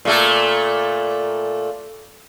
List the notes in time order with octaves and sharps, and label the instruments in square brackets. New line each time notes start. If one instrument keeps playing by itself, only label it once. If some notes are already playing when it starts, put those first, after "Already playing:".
[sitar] A#2 A3 A4